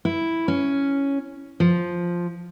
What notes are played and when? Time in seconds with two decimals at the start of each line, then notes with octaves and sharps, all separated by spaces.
0.05 E4
0.48 C#4
1.60 F3